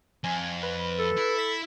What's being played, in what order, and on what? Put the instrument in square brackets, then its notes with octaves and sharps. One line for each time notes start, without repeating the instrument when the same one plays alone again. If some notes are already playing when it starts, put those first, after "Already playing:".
[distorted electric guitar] F2 [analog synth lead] G#5
[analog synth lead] B4
[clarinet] A4
[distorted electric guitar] E4
[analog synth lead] B6